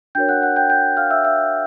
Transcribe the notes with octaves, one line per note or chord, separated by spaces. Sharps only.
D4 F#4 A#4 C#5 G5 G6
F#5 F#6
F#5 F#6
G5 G6
G5 G6
F5 F6
E5 E6
E5 E6